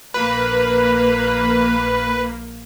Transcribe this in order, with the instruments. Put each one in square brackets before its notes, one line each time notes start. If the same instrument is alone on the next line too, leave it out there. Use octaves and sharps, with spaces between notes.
[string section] A#1 A#3 [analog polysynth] B4